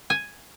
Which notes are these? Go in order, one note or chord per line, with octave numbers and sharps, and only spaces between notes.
G#5